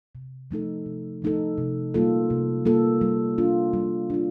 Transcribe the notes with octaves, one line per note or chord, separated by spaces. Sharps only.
C3
F3 A3 D#4 A4
C3
F3 A3 D#4 A4
C3
G3 A#3 F4 A4
C3
G3 A#3 F4 A4
G3
D4 F4
G3
D4 F4